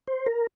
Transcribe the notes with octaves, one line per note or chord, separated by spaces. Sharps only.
C5
A#4